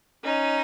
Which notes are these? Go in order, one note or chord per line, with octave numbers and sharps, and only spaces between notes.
C#4 D#4